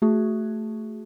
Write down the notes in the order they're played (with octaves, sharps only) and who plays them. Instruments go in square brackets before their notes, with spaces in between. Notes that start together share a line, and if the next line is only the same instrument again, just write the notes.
[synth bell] A3 F#4 G#4